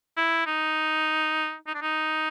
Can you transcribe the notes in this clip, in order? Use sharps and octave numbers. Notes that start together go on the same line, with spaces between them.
E4
D#4
D#4
D4
D#4